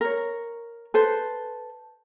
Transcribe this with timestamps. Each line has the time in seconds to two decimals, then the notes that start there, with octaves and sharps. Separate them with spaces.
0.01 A#4 C#5
0.94 A4 B4 C5